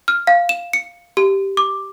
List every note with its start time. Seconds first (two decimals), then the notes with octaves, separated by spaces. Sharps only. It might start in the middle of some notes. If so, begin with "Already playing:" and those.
0.08 F6
0.27 F5
0.49 E7
0.73 C#7
1.17 G4
1.57 D6